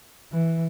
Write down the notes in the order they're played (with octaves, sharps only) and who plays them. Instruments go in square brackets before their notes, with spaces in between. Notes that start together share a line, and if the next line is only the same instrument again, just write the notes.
[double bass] E3